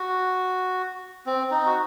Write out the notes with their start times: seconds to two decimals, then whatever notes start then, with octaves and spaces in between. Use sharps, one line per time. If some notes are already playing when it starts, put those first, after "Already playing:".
Already playing: F#4
1.26 C4
1.51 D#4
1.66 F#4